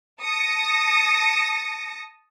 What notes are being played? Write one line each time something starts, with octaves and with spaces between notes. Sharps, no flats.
A5 D#6 A#6 C#7